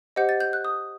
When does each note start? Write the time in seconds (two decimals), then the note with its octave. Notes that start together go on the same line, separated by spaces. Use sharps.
0.16 G4 C5 D#5 F#5 G6
0.29 A6
0.40 G6
0.53 F#6
0.65 D#6